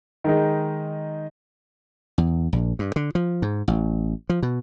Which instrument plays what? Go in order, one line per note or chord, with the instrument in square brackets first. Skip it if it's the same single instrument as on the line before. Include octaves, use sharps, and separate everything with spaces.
[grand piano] D#3 G#3 D#4
[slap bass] E2
A#1
G2
D3
F3
G#2
A1
F3
B2